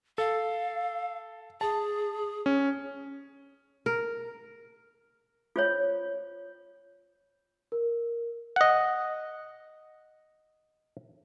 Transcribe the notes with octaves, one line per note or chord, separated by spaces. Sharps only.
A4 F5
G#4 A5
C#4
A#4
F4 C5 C#5
A#4
D#5 F#5